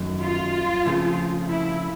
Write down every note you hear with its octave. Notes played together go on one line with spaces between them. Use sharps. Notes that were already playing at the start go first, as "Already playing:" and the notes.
Already playing: F#2 D#3 F#3 A3 C#4
F4
C#3 F3 A3 C4
E4